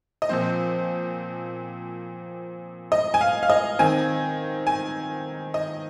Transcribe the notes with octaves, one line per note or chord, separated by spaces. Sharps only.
D#5
A#2 F3 C4 C5
D#5
G#5
F5
F5
D#5
D#3 C4 G#5
G#5
D#5